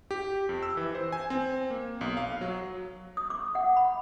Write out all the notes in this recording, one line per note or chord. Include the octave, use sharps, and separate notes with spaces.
G4
F2
E6
E3
C5
G#5
C4
A#3
B1
F5
F#3
D#6
D6
F#5
B5